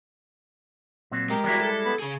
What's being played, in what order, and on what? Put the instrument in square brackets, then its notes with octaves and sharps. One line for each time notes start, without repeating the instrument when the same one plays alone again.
[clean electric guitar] A#2 F#3 C4
[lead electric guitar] G#3 [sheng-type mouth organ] G4 A#4
[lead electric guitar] E2 F#4 [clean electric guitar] G3 G#3 E4
[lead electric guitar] A4
[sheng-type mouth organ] B3 B5
[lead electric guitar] C#3 G#4 [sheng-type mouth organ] G#5